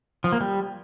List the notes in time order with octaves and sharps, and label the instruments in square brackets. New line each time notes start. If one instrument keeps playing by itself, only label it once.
[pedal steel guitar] F3
A#3
G3